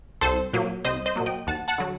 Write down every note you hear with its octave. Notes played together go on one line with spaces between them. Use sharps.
C2 A4 C5
A#2 F#3 A#3
C2 C5 D#5
C5 D#5
A#2 F#3 A#3
D#5 G5
D#2 F#5 A5
F#5 A5
D3 F#3